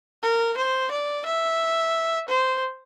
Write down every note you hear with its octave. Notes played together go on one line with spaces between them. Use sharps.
A#4
C5
D5
E5
C5